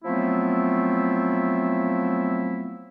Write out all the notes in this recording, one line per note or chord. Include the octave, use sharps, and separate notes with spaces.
F3 F#3 A3 B3 C4 E4